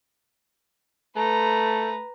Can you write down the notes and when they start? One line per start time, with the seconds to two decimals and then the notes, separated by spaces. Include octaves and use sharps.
1.17 A3 B4 A#5